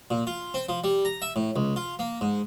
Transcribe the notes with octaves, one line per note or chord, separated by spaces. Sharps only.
A#2
F4
C4
F3
G3
A#5
E5
A2
C#2
F4
A#3
G#2